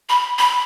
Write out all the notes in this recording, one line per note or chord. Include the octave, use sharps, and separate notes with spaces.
B5
B5